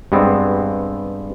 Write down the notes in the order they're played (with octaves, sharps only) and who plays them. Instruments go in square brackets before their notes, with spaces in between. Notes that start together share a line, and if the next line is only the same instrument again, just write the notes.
[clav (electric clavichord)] G2 G#3 B3 C4